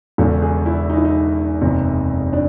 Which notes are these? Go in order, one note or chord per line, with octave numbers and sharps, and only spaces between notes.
E1 E2 C#3 A4
G#4
E4
D#4
E4
D#4
F#1 E2 C3
D4